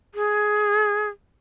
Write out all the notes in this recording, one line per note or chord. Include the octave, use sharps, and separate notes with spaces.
G#4